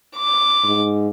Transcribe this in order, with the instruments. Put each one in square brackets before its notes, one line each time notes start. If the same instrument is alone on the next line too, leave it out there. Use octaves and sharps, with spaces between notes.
[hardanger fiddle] D6
[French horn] G#2